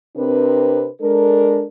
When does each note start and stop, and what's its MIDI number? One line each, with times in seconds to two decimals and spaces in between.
0.16 0.88 48
0.16 0.88 60
0.16 0.88 62
0.16 0.88 70
0.16 0.88 71
1.01 1.64 56
1.01 1.64 62
1.01 1.64 69
1.01 1.64 70